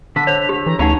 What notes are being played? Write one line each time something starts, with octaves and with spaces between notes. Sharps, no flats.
D3 B6
C5 C#5 F7
G4
E3 A#5
D2 C#4 D#4 F#5 A#5 F7